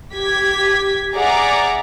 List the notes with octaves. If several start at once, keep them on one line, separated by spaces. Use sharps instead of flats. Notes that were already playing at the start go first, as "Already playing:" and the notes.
G4 G#6 B6
G#4 D5 E5 F#5 A#5 D6